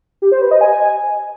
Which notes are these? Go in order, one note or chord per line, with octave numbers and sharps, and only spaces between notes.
G4
C5
B4
D#5
G#5